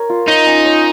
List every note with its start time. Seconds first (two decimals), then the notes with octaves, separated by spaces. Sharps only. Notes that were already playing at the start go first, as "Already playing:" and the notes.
Already playing: A#4 C#5
0.10 F4
0.28 D#4 C#5
0.46 C#4
0.65 C#5